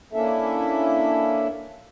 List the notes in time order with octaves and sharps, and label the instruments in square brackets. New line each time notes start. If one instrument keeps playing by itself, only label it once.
[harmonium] A#3 C#4 D4 E4 A4 E5